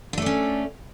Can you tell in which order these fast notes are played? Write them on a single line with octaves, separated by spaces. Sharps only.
D4 A3 D5 C#4